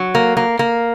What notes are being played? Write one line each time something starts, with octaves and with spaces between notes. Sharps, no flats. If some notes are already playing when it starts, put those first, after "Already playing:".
Already playing: F#3
A#3
A#3
A#3